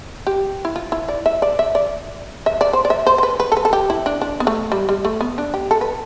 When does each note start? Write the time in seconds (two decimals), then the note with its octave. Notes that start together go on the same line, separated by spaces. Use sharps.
0.27 G4
0.65 E4
0.76 F4
0.92 E4
1.08 D5
1.26 E5
1.42 D5
1.59 E5
1.75 D5
2.46 E5
2.61 D5
2.73 C5
2.85 D5
2.90 E5
3.07 C5
3.18 C5
3.23 B4
3.40 B4
3.52 A4
3.57 B4
3.65 A4
3.73 G4
3.90 E4
4.06 D4
4.22 D4
4.40 B3
4.47 A3
4.72 G3
4.89 G3
5.05 A3
5.21 B3
5.38 D4
5.54 G4
5.71 A4
5.81 B4